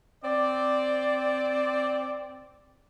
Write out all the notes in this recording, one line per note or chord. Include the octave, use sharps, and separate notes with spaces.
C4 D5